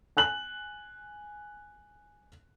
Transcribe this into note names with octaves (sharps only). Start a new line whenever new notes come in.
G#5 F#6 F#7